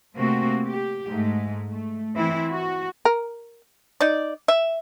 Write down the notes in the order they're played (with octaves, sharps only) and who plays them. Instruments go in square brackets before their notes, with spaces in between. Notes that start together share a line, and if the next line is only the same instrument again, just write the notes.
[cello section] C3 A3 A#3 C4 F#4
G4
G#2 G#3 A3
A3
E3 C4 E4
F#4
[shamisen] A#4
[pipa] D#4 D5
E5